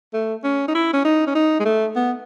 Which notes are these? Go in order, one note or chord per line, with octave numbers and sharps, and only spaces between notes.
A3
C#4
D#4
E4
C#4
D#4
C#4
D#4
G#3
A3
B3